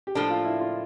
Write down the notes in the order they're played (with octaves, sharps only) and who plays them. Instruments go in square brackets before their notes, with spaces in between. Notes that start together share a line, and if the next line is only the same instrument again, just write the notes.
[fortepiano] G4
[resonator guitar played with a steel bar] A2 F3 A#3 D4 [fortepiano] A4
[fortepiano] F4
E4
F4